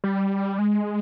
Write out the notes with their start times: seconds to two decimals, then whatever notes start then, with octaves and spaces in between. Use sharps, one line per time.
0.04 G3
0.59 G#3